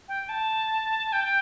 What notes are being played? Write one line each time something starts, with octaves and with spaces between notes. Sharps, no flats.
G5
A5
G5